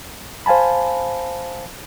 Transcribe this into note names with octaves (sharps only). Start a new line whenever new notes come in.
C5 F5 G#5 A5 B5